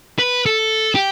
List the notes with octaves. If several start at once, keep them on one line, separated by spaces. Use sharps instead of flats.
B4
A4
G4